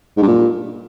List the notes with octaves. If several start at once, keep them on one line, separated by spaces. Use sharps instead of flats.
G#2
G2
A#2